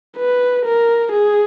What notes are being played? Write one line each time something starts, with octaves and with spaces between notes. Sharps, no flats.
B4
A#4
G#4